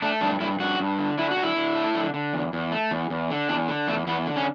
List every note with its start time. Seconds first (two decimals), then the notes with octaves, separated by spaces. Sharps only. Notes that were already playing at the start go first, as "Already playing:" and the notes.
0.02 A3 D4
0.21 G2 D4
0.40 G2 E4
0.59 G2 F#4
0.79 G2
0.99 D3
1.18 D3 E4
1.31 F#4
1.37 D3
1.43 E4
1.56 D3
1.76 A3
1.95 D3
2.14 D3
2.33 E2
2.53 E2
2.72 A3
2.91 E2
3.10 E2
3.30 D3
3.49 E2 D4
3.68 D3
3.88 E2 A3
4.07 E2 B3
4.26 D3
4.36 C#4